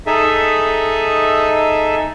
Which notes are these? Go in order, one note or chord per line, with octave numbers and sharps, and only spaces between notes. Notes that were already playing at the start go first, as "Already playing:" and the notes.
D#4 G#4 A4 D#5 E5